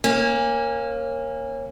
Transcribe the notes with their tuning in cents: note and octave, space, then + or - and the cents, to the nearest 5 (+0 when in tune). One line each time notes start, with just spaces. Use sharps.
A#3 +0 C#4 -25